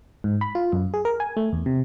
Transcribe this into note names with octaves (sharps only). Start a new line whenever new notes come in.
G#2
B5
F4
F#2
G#4
A#4
G#5
A3
E2
C3